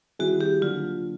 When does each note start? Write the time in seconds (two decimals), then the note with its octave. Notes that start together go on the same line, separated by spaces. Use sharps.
0.19 D#3 G3 C4 E4 F#4 G#4
0.41 G4
0.61 D3 F#3 A#3 D4 F4